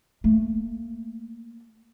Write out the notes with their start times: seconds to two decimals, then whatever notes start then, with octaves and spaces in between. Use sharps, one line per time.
0.24 A3 A#3